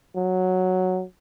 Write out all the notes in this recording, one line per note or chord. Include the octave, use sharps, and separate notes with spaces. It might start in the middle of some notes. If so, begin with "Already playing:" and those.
F#3